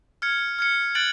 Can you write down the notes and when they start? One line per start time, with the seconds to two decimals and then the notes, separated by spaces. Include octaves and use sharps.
0.22 F6 G#6 C#7
0.59 F6 G#6 C#7
0.95 F#6 A6 D7 F#7